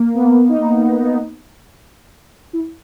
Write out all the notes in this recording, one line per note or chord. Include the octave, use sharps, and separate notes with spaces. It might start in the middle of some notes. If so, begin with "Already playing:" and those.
Already playing: A#3
B3
D#4
E4